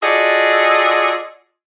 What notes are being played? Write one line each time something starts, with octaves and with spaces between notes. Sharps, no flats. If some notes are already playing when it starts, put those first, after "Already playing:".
F4 F#4 G#4 A4 D5 D#5